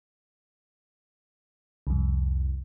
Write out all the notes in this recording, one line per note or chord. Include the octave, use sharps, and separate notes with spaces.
C2 F2